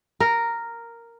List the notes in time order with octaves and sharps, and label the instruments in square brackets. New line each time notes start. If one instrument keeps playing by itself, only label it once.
[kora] A#4